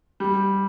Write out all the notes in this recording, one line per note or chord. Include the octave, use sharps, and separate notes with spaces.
G3